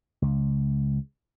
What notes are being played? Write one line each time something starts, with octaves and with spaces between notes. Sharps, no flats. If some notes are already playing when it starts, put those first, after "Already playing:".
C#2